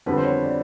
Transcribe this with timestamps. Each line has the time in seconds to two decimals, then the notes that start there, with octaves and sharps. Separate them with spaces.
0.06 F2 D3 G3 B3 B4
0.17 C5
0.24 C#5
0.43 D5